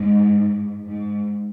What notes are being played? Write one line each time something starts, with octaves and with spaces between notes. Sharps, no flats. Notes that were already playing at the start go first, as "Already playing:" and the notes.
Already playing: G#2
G#2